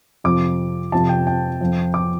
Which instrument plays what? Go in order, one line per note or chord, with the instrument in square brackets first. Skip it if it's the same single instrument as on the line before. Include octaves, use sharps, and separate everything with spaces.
[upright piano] F2 C3 F3 D6
F2 C3 F3 A5
G5
G5
F2 F3
D6